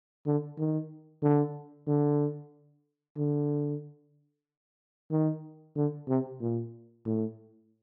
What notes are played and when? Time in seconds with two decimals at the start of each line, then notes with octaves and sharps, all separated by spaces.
0.26 D3
0.58 D#3
1.23 D3
1.88 D3
3.17 D3
5.11 D#3
5.76 D3
6.09 C3
6.41 A#2
7.06 A2